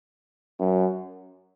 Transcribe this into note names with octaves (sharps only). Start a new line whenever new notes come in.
F#2